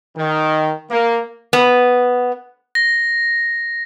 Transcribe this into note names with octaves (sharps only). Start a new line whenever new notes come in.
D#3
A#3
B3
A#6